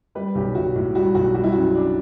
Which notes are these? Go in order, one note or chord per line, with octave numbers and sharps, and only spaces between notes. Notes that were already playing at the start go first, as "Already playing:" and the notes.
G3 B4
B1 G4
B1 F#4
A2
G3 F#4
B1 F#4
G3 F#4
E4
F#2 F#4
D4